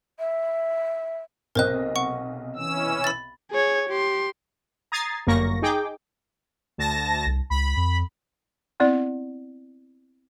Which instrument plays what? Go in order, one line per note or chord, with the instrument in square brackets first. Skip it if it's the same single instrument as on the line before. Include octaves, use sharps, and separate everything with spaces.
[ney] E5
[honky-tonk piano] B1 C3 D#5 [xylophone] A#4 C5 F#6
[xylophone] F#5 C#6
[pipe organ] E3 C#4 E6
[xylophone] B5 A6
[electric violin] G#4 C#5
G4 C6
[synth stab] A#5 D#6 G#6 A6 C7
G1 F#2 A#3 C#6 A#6
D#4 G#4 G5 D6
[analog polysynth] D2 A5 A#6
[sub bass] C2
[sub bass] C#2 [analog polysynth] B5
[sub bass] F2
[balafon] B3 C4 E4 D5